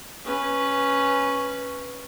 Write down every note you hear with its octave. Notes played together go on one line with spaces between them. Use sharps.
C#4 B4